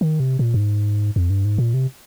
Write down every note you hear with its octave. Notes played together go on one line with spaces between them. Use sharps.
D#3
C3
A#2
G2
G#2
F2
G2
G#2
A#2
C3